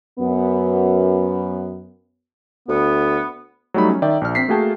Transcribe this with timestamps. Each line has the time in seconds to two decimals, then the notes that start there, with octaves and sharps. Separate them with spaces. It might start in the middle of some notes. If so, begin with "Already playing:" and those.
0.19 F#2 B3
2.68 D2 B3
3.74 F#3 G3 A3 D#4 B5
3.89 C#4
4.02 D#3 D5 E5 G5
4.21 A#1 F6
4.35 C4 B6 C7
4.48 A3 A#3 F#4 G#4 G5 A5